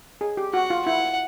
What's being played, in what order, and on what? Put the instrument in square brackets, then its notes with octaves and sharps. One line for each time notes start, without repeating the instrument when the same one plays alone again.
[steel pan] G#4
G4
[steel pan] F#4 [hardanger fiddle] F#5
[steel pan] F4
[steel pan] E4 [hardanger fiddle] F#5